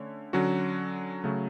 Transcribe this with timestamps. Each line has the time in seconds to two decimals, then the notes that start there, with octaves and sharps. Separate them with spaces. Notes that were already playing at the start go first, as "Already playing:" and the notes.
Already playing: D3 A3 C#4 C#5
0.33 D3 F#3 C#4 F#4
1.24 C#3 F#3 A3